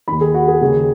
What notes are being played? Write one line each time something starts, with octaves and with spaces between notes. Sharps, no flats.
D#2 D#3 B5
G#4
F#4
G#4
D#2 C#3 G#4